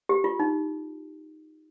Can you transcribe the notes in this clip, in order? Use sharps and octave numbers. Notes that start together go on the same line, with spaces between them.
G4
F4
D#4